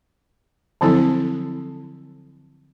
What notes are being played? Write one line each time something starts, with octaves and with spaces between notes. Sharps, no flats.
D3 F3 F#3 C4 E4 A4